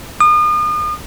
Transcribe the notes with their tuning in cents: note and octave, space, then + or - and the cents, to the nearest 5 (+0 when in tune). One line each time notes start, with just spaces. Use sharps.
D#6 -40